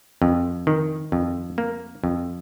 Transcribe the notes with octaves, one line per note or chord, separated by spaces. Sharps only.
F2
D#3
F2
A#3
F2